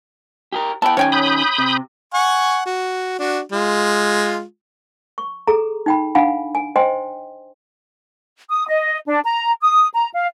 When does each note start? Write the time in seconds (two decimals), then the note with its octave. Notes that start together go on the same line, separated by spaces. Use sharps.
0.52 G4 G#4 A#4
0.82 B3 E4 G5 A5
0.97 D#3 C#4 C#5 G5 G#5
1.12 B5 D#6 G6
1.58 C3
2.14 F#5 G#5 C#6
2.66 F#4
3.19 D4 F#4
3.52 G#3 F4
5.18 C#6
5.47 G#4 A4 A#5
5.86 D#4 G5 B5
6.15 D4 F5 F#5 G#5 B5
6.55 G#5
6.76 C5 D#5 G5 G#5 C6
8.49 D#6
8.68 D#5
9.07 D4
9.25 A#5
9.62 D#6
9.94 A#5
10.13 F5